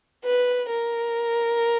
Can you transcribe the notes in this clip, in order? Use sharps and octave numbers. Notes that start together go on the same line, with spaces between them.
B4
A#4